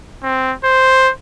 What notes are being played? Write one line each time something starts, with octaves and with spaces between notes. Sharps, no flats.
C4
C5